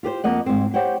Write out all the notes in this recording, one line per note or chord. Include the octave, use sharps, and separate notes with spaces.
F4 G4 B4 C5
F2 A#3 D#5 F#5
G#2 C4
G4 C5 C#5 F#5 G5